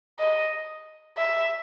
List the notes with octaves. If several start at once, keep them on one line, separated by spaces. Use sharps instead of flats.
D#5
E5